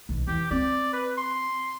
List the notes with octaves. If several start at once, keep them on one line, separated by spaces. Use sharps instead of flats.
B1 D#3
E2 G4
C4 D5
B4
C6